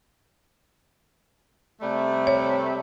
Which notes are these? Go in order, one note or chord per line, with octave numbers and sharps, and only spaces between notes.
C3 G3 A3
C#5